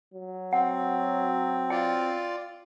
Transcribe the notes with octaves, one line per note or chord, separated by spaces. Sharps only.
F#3
C4 F#5
F4 D5 G5